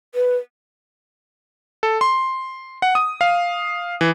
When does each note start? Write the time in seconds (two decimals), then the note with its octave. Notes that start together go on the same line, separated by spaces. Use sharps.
0.15 B4
1.83 A4
2.01 C6
2.82 F#5
2.95 D#6
3.21 F5
4.01 E3